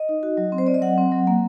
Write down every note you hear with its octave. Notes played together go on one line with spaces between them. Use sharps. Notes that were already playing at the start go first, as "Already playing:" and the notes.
Already playing: D#5
D#4
F#4
F#3
C4
C5
C4 D5
D#5
F#3 F#5
C4
F#3
A#3